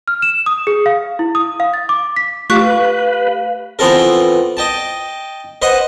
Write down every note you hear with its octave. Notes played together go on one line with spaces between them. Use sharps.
F6
E7
D#6
G#4
F5
E4
D#6
F5
A6
D6
B6
A3 F4 G4 F5 C#6 D6 F#6 B6
B4
E3 B3 C4 F4 A4 A#4
D#5 G5 A5
B4 C5 D#5 F#5